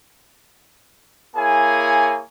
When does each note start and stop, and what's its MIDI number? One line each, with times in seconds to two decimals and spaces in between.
1.36 2.21 58
1.36 2.21 64
1.36 2.21 68
1.36 2.21 73
1.36 2.21 80